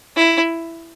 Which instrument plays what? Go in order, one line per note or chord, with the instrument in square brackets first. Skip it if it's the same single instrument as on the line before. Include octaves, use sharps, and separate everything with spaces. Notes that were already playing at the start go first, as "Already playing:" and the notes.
[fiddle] E4